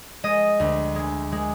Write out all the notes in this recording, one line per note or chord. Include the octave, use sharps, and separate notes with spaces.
G#3 D#5
D2
G#3
G#3